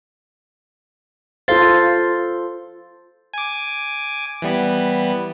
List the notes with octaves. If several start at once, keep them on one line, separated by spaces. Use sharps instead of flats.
F4 A4 C5 F5 A6
G#5 D6
E3 G3 B3